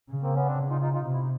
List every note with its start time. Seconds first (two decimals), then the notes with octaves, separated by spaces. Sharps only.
0.10 C#3
0.22 A#3 C4
0.35 B3 C#4
0.46 C4 D4
0.58 C#3
0.69 D#4 F4
0.81 D#4 F4
0.94 D#4 F4
1.05 C3 F4
1.13 E4
1.22 D#4